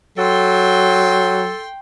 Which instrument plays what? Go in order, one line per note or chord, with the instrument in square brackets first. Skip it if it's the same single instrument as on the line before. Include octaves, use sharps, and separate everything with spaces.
[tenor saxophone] F#3 [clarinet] A4 [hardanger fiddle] G5 C6